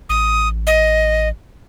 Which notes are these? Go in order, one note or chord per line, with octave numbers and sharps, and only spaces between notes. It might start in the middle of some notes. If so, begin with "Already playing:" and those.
A1 D#6
D#5